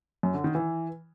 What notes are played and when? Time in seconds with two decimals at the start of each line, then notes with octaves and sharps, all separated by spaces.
0.23 F#2
0.34 D3
0.44 D#3
0.55 E3